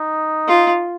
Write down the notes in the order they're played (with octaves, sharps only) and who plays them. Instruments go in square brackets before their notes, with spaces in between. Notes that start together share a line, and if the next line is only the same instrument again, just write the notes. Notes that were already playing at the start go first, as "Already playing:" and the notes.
Already playing: [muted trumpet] D#4
[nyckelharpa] F4